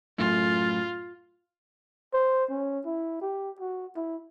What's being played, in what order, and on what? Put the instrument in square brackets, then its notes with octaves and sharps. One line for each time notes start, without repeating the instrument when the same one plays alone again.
[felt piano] F#2 A2 C6 [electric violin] F4
[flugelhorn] C5
C#4
E4
G4
F#4
E4